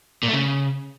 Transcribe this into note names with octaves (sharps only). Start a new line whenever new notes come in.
A#2
A3
C#3